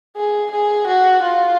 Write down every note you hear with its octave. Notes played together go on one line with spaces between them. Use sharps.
G#4
G#4
F#4
F4